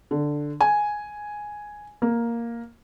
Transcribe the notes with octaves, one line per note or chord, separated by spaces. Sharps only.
D3
G#5
A#3